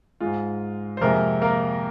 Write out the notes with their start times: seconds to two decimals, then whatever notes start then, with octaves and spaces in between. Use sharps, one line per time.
0.20 G#2 G#3 F4
0.97 C5
1.01 F2 C3 G#3 A#3 A#4
1.42 A#3 A#4